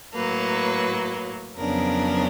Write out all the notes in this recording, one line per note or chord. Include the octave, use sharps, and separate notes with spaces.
A2 F#3 A#3 B4
F2 C#3 F#3 B3 D4 A#4